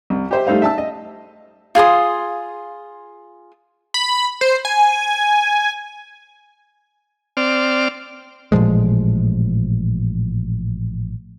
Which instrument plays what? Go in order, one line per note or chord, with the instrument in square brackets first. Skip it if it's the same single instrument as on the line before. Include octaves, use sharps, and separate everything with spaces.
[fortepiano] C2
G4 C5 E5
G3 A3 D#4 C5 F5
E5 A5 E6
D#5
[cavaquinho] F4 G#4 C6 D#6
[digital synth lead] B5
C5
G#5
[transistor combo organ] C4 D5 F6
[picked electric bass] A1 A#2 F3 G#3